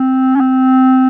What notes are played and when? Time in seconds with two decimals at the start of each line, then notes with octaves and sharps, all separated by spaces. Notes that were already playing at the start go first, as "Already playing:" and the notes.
Already playing: C4
0.36 C#4
0.40 C4